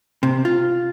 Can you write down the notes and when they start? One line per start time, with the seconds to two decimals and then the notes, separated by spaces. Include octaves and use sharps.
0.23 C3
0.45 F4